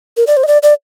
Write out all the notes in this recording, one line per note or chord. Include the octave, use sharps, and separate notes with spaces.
A#4
D5
C5
D#5
D5
D5